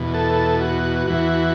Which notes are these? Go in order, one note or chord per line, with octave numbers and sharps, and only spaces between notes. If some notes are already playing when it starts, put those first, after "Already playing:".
Already playing: E2 B2
A4
F#4
E2 E3 F#4